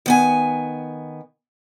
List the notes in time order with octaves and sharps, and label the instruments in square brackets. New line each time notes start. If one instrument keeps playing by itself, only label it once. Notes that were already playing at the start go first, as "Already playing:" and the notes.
[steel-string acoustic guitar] D#3 B3 G#5